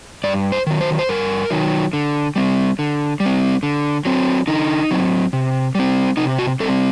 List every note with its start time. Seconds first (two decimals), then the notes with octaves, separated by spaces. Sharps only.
0.24 G2 D5
0.52 C5
0.67 D#3 F#3
0.81 C5
0.99 C5
1.09 G2 A#4
1.50 D#3 F#3
1.93 D3
2.36 G3 C4
2.79 D3
3.20 G3
3.26 C4
3.63 D3
4.05 F#3 C4
4.47 D3 D#4
4.91 F#3 C4
5.33 C3
5.75 G3 C4
6.17 C3 D#4
6.39 F#4
6.60 G3 C4 A4